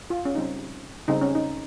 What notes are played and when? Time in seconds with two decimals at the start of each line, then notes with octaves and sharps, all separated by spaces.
0.10 F4
0.25 C#4
0.35 C#3 G3 C4 D#4
1.08 C#3 G3 C4 D#4
1.21 C#4
1.35 D#4